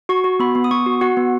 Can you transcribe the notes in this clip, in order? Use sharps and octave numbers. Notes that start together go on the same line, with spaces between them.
F#4 C#6
F#4
B3 B5
B3
D#6
B3 C#6
F#4
F#4 F#5
B3